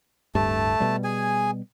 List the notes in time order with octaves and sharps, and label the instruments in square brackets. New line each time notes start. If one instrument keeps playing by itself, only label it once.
[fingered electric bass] D1 G2 [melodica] A3 A5
[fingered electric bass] B2 G3
[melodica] G#4 G#5